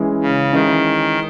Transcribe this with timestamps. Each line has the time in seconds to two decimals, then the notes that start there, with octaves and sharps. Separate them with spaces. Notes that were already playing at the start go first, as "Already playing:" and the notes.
Already playing: E3 G#3 C#4
0.22 C#3
0.53 D#3 E3 G#3 C#4